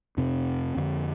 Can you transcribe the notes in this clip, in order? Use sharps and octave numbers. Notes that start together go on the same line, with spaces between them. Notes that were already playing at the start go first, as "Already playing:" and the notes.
F2 C3 C4
F2 D3